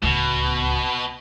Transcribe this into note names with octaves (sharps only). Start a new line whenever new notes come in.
D1 C#2 B2